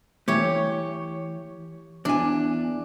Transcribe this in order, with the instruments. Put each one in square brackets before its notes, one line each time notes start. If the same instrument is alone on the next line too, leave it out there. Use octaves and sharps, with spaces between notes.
[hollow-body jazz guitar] E3 A3 [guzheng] G4 C#5
[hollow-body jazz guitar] E2 G#5 [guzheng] D4